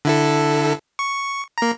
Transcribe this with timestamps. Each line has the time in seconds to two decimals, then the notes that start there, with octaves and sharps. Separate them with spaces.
0.05 D3 E4 A4
0.99 C#6
1.58 A#3 A#5